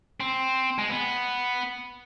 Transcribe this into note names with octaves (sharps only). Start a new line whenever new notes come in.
C4
G#3
B3